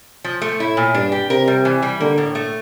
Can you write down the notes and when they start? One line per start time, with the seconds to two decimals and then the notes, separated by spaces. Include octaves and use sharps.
0.24 F3
0.42 A3
0.60 A2 E4
0.77 A#2
0.94 G2 D4
1.12 G4
1.29 C3 A#4
1.47 G3
1.65 E3
1.82 G3
2.01 D3 A#3
2.18 A2
2.35 A3